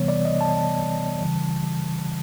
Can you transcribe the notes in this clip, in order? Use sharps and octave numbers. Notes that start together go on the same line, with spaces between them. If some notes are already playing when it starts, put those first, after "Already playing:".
Already playing: C3 E3 G3 B3 C#5
D5
D#5
A5
A5
C#3 E3 G3